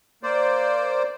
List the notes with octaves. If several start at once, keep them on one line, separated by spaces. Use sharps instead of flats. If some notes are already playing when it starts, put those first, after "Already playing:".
A#3 C5 D5